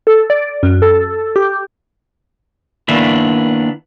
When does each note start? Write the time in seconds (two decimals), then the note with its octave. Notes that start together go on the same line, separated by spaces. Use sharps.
0.07 A4
0.30 D5
0.63 F#2
0.82 A4
1.36 G4
2.88 D#3 A#3 B3 D4 E4